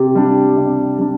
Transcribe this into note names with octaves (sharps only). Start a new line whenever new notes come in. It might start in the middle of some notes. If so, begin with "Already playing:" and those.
Already playing: C3 G4
G3 D4 F4
C3
G3 D4